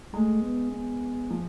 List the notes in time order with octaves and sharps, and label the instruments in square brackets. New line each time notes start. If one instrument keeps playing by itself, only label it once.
[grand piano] G#3 [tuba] A3
[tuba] B3
B3
[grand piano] F3